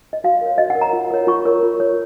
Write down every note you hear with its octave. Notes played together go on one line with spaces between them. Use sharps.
D#5
F#4 F5
A#4 C#5
F#4 D#5
F#5
A#4
C#5 A#5
F4
A#4 C#5
F4 C#6
A#4 C#5
F4
A#4 C#5